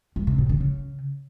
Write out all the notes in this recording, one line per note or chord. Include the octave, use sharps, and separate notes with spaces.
G2
C3
A2
D3
C#3